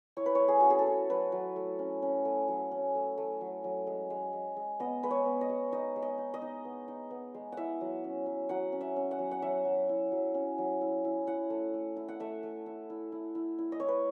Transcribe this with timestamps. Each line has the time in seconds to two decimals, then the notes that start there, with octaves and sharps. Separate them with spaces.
0.17 E4 C#5
0.26 B4
0.35 A3 C#5
0.48 G#4
0.60 C#4 F#4
0.70 G#4
0.79 A4
0.87 E4
1.10 F#3 B4
1.32 F#3
1.56 A3
1.79 C#4
2.02 C#4
2.25 A3
2.48 F#3
2.71 C#4
2.95 A3
3.18 A3
3.41 F#3
3.64 F#3
3.87 G#3
4.10 G#3
4.33 G#3
4.56 G#3
4.80 B3 D#5
5.03 G#3 B4
5.10 C#5
5.25 B3
5.41 D#5
5.49 G#3
5.72 D#4 D#5
5.96 G#3
6.02 D#5
6.18 D#4
6.34 D#5
6.42 D#4
6.65 B3
6.88 D#4
7.11 B3
7.34 G#3
7.52 E4 E5 F#5
7.81 F#3
8.04 C#4
8.26 F#3
8.49 F#3 F#5
8.72 C#4
8.81 E5
8.96 C#4
9.11 F#5
9.19 F#3
9.31 F#5
9.42 F#3 E5
9.65 F#3
9.89 E4
10.12 F#3
10.34 C#4
10.58 F#3
10.81 E4
11.05 E4
11.27 E4 F#5
11.50 A3
11.74 A3
11.96 E4
12.08 F#5
12.20 A3 E5
12.43 A3
12.66 E4
12.90 E4
13.12 E4
13.35 E4
13.59 E4
13.72 D#5
13.80 E4 C#5
13.88 B4